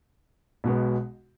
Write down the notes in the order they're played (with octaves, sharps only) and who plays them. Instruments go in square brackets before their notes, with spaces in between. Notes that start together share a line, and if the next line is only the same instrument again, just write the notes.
[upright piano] B1 B2 G#3 B3